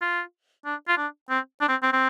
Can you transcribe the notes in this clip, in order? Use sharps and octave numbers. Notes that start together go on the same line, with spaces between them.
F4
D4
F4
D4
C4
D4
C4
C4
C4